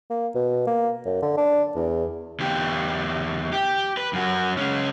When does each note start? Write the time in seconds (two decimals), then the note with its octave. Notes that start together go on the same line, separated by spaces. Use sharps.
0.10 A#3
0.35 B2
0.67 A#3
1.05 F#2
1.22 D3
1.37 D4
1.75 E2
2.40 E2 G4
3.53 G4
3.97 B4
4.13 F#2 F#4
4.57 G#3 C#4